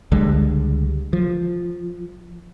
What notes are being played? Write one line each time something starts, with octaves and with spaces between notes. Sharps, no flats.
C#2 D3 G3 G#3
F3